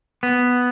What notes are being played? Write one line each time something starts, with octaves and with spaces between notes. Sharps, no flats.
B3